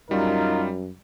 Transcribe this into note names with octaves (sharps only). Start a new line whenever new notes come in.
F#2 G3 D#4 F4 A#4